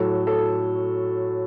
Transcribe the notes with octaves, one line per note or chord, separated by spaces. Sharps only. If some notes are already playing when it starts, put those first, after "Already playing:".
Already playing: A2 F#3 A4
A4